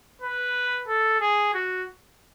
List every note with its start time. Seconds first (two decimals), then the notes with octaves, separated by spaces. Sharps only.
0.21 B4
0.88 A4
1.21 G#4
1.54 F#4